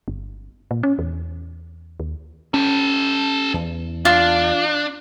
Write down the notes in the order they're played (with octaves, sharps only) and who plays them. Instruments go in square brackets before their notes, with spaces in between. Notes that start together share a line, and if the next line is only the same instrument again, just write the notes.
[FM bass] G1
A#2
C#4
E2
D#2
[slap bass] C#4 [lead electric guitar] G4 A4
[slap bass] E2
[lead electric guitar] D4 [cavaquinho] F4